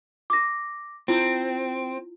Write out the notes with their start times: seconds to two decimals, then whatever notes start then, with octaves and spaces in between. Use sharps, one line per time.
0.30 D6 A#6
1.08 C4 E4 F4